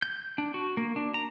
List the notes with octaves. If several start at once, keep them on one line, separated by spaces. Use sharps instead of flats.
G6
D4
F#4
A#3
D4
A#5